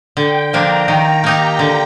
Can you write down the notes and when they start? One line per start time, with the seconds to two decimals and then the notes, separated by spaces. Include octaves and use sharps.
0.17 D3 G5
0.52 F3 A#3 D4 A#5
0.88 D#3
1.24 A#3 D#4 G4
1.59 D3